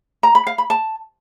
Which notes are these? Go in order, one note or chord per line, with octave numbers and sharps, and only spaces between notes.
A#5
B5
F5
B5
A5